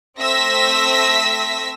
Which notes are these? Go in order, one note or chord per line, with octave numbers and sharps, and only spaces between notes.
A3 C4 E5 E6 A#6 B6